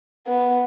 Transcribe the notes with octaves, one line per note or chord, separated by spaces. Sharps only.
B3